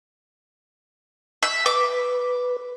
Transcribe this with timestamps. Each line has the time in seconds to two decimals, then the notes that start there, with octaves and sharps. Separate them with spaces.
1.43 E5
1.66 B4 D6